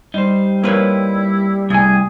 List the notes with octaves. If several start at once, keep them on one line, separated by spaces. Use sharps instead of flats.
G3 D#4 C5
A#3 E4 B4 C#5
C2 A3 G#4 G#5